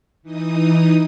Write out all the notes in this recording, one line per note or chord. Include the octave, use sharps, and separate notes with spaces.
E3 D#4 D#6